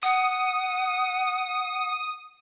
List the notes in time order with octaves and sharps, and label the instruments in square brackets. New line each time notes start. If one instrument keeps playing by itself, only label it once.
[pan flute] F#5 [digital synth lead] D#6